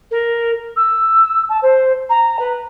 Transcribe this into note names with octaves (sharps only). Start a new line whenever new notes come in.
A#4
E6
A5
C5
A#5
B4